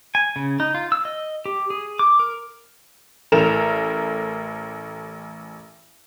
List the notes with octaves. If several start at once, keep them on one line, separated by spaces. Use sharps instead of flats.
G#5
C#3
D#4
F4
E6
D#5
G4
G#4
D6
A#4
A1 A4 A#4 E7 F7